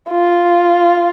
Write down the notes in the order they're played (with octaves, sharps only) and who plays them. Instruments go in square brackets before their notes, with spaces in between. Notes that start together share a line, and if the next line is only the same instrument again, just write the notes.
[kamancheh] F4